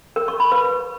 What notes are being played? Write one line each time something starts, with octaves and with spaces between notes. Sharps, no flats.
A#4
C#6
B5
B4